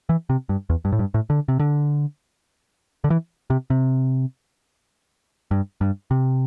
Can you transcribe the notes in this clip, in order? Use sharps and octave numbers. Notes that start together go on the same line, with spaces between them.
E3
C3
G2
E2
G2
A2
G2
A2
D3
C3
D3
D3
E3
C3
C3
G2
G2
C3